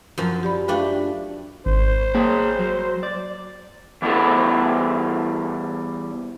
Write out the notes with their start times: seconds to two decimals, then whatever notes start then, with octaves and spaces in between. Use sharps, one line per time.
0.18 F#2 F3
0.43 G4 D5 B5
0.68 A3 D4 F4 B4 F5 G5
1.66 G#1 C5
2.15 A#3 G#4 C#5 G5
2.59 F#3
3.03 D5
4.02 E3 G3 B3 E4 A4 B4